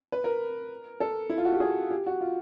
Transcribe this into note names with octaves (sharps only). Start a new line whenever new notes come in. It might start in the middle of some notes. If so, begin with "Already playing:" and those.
B4
A#4
A4
E4
F4
F#4
G4
G#4
G4
F#4
F4